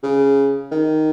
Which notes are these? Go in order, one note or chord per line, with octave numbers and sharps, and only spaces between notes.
C#3
D#3